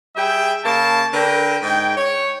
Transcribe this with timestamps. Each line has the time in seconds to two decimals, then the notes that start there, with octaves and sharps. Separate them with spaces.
0.16 G3 G#4 E5 G5
0.65 C#3 A#3 A5
1.12 D3 A#4 B4 G5
1.63 G#2 G5
1.96 C#5